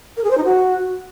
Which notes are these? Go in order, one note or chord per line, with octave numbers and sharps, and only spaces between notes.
A#4
G#4
C5
D#4
F#4